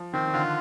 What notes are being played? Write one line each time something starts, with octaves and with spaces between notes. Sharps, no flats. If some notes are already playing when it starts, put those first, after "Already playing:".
Already playing: F3
D#3 C4
D#3
D3 F4